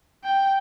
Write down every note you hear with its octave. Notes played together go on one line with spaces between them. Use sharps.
G5